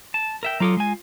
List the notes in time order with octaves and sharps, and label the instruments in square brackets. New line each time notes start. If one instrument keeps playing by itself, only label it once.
[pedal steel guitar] A5
A#4 E5 G5
[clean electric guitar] F#3 F4 A4 [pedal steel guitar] A#5 D6 D#6
[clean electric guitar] G#3 G#5 [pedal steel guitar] F4